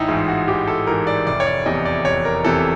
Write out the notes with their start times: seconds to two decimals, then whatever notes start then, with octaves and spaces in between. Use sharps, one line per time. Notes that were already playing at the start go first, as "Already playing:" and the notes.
Already playing: A1 D#4 E4
0.08 G#2 E3 F4
0.28 F#4
0.48 A1 G4
0.67 A4
0.87 G#2 E3 A#4
1.07 D5
1.27 F1 D5
1.40 C#5
1.47 D5
1.66 E2 C3 E3 D#5
1.85 D5
2.05 F1 C#5
2.25 A#4
2.44 E2 C3 E3 A4